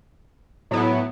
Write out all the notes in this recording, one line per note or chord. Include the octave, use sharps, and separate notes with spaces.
A2 F#3 B3 E4